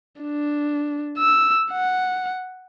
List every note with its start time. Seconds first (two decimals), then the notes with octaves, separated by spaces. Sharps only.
0.22 D4
1.18 E6
1.71 F#5